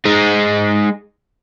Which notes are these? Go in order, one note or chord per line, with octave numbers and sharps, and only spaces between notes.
G#3 D#4